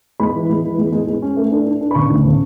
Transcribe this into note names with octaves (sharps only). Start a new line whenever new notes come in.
G#3 B5
E3
G#3
E3
G#3
G#3
G#3
C#4
A3
D4
D4
D4
B5
C#3 C#6
D2
C#3